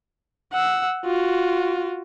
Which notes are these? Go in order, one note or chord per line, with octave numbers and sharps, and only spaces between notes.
F#5 E6
F4 F#4